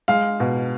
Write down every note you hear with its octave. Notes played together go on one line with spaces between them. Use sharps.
G#3 F5
B2